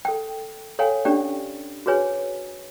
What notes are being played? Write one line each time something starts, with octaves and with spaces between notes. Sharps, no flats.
A4 G5
A4 C#5 F5 G5 G#5
C#4 D4 G4 D5 G5
F#4 G#4 B4 C#5 G#5